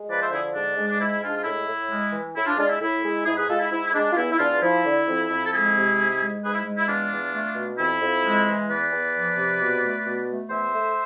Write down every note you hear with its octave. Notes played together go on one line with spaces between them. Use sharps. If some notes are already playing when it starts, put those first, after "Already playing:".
Already playing: G#3
F3 B4 D5
C5 E5
D3 E4 G#4
G#2 D4
G#3
D4
G#2 E4
G#3 D4 F4
F4
A2 E4
A2
G#3
E3
A2 E4
D4 F4
G#3 D4 F4
E4
A2 E4
G#3
G#2 E4 G#4
G#4 B4
G#3 F4 A4
E4
G#2 E4
E4
G#3 D4
F4
E2 E4
E4
E2 D4 F4
F3 E4
D3
F2
F2
A4
G#3 E4 G#4
C3
G#2
G#3
G#2 G#4 B4
E4
G#3
E4
E2 D4 F4
E2
A3
B2
F2 E4
F2
G#3
E3
E2 B4 D5
E2
F3
C3
B2
A3
B2
A3
E2 C5 E5
A3